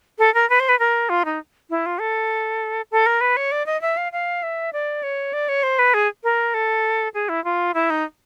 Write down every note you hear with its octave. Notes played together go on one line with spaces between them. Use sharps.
A4
A#4
B4
C5
B4
A#4
F4
D#4
E4
F4
A4
A4
A#4
B4
C#5
D5
D#5
E5
F5
F5
E5
D5
C#5
D5
C#5
C5
B4
G#4
A#4
A4
G#4
E4
F4
E4
D#4